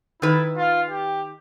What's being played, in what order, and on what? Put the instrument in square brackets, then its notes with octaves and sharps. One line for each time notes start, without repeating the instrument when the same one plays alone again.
[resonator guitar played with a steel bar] D#3 B4 [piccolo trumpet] E4
[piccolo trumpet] F4
G4